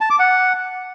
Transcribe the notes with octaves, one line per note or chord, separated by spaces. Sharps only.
A5
D6
F#5